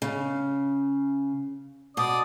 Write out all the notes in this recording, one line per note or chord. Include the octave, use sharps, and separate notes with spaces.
C#3
B2 D5 D#6